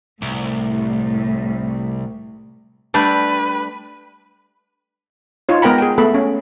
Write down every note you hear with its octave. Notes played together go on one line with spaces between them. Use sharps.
C2 A2
G3 A3 D4 B4
D#4 F4 C#5
G#3 B3 A#4 G5 A#5 B5
G#4 G5
A3 B3 A4 B5
C#4